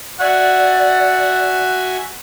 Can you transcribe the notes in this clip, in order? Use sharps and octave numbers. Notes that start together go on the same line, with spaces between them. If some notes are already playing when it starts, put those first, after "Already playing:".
F#4 D5 E5 F#5 G#5